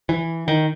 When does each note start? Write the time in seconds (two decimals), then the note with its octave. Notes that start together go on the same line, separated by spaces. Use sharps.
0.09 E3
0.48 D#3